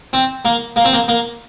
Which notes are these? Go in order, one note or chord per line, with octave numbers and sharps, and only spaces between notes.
C4
A#3
A#3
C4
A#3
A#3